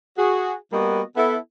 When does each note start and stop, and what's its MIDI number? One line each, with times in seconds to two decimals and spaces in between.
0.18 0.54 66
0.18 0.54 68
0.72 1.02 55
0.72 1.02 58
0.72 1.02 59
0.72 1.02 66
0.72 1.02 70
0.72 1.02 75
1.16 1.36 59
1.16 1.36 64
1.16 1.36 69